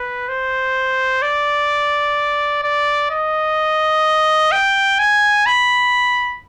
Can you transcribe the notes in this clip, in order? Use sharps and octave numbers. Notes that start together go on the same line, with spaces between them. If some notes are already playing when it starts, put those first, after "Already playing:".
Already playing: B4
C5
D5
D5
D#5
G5
G#5
B5